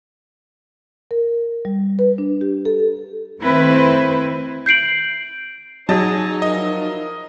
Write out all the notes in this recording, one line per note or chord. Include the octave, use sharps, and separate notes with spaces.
A#4
G3
B4
D4
G4
A4
D#3 A3 C4 E4 B4 C5
G6 C7 D7 F#7
F#3 D#4 G#4 D#5 A5 A6
F3 E4 A#4 D#5